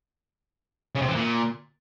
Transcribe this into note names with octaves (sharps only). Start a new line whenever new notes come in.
C#3
C3
E3
A#2